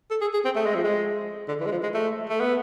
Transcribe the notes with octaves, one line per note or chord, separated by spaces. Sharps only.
A4
G#4
G#4
C4
A3
G#3
F3
G#3
D3
E3
G#3
F3
G#3
A3
A3
B3